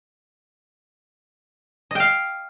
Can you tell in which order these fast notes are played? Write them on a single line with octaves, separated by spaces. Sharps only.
D#5 G5 F5